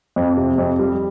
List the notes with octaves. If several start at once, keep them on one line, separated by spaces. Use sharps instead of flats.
F2
C3
F2
G3